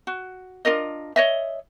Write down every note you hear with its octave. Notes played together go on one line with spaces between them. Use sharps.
F#4
D4 F4 A#4 D#5
C#5 D#5 E5